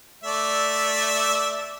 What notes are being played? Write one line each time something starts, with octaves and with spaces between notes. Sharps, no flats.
A3 D5 E5